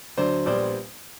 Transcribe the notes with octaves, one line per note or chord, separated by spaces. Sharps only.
D2 D3 F#3 C5 D5
A#1 A#2 G3 B3 C5 D5